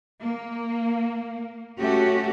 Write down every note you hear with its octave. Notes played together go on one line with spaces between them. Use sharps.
A#3
A3 C#4 F#4 G4